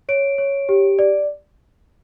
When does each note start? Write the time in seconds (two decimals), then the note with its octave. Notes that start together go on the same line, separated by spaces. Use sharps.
0.09 C#5 D7
0.38 C#5
0.69 G4
0.99 D5